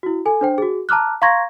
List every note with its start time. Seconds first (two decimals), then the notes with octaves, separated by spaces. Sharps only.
0.03 E4 F#4
0.26 A4 G#5
0.41 D4 C5 G5
0.58 F#4 G#4
0.89 A5 A#5 D6 F6 F#6
1.22 F5 A#5 C6 C#6 G#6 A#6